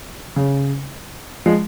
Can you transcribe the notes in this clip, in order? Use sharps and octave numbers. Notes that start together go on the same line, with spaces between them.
C#3
F3 G#3